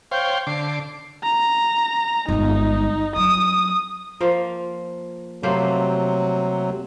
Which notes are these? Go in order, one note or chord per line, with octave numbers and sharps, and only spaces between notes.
C5 C#5 F5 G5
D3 D6 C7
A#5
G1 G#3 D#4
F#3 D#6
F3 A#3 F4
C3 F#3 A3 A#3 C5